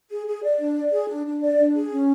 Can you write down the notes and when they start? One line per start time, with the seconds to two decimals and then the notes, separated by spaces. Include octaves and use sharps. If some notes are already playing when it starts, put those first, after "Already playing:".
0.10 G#4
0.27 G#4
0.44 D5
0.59 D4
0.76 D5
0.92 G#4
1.08 D4
1.26 D4
1.42 D5
1.59 D4
1.75 G#4
1.91 C#4